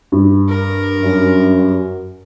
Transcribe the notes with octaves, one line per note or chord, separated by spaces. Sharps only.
G2
A#4
F#2